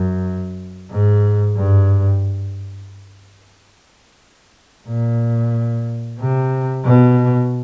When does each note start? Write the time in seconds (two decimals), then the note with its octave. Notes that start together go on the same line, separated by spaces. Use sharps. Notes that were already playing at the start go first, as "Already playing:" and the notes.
Already playing: F#2
0.91 G#2
1.56 G2
4.87 A#2
6.19 C3
6.84 B2